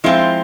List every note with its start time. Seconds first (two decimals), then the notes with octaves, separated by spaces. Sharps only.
0.04 F3 G#3 C4 E4 F4